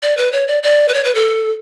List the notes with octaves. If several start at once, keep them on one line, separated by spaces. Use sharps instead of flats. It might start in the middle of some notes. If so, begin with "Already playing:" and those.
D5
B4
C#5
D5
D5
B4
C#5
B4
A4